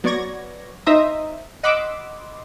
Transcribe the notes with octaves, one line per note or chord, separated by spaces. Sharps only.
F#3 B3 D5 C#6 G#6 A#6
D#4 C5 D#5 E5 A#5 D#6
D#5 F#5 B5 C6 D6 E6